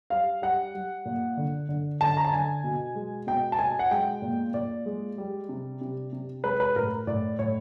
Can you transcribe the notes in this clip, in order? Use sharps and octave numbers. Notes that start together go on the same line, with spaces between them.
G3 F5
G3 F#5
G3
A#2
D3
D3
D3 A5
A#5
A5
D3 G#5
B2
G#3
B2 G5
A5
B2 G#5
F#5
G#3 G5
A#2
A#2 D5
G#3
G3
C3
C3
C3
G#3 B4
B4
A2 A#4
A2 D5
A2 C#5